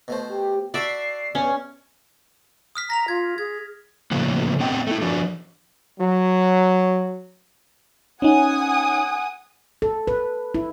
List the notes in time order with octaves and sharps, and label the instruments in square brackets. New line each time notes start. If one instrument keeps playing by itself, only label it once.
[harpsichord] B2 A3 C5
[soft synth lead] G4
[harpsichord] E4 F#4 A4 [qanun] D5 E5 [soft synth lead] C7
[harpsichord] E2 G2 [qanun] C#4
[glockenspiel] D#6 F6 B6
[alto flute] A#5 [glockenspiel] A#6 B6 F7
[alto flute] F4 [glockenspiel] G#6
[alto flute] G#4 [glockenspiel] G#6
[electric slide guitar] A2 C#3 F3 A#3 B3
B3 C4 D#5 F#5 G5
A3 E4
F3 D4 F#4
[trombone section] F#3
[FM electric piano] C#4 D#4 [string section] F#5 G#5 D#6
[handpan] A4
B4
E4